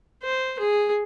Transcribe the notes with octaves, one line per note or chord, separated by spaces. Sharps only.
C5
G#4